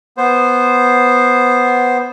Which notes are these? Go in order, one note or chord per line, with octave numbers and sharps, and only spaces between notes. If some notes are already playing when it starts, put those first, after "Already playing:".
B3 C5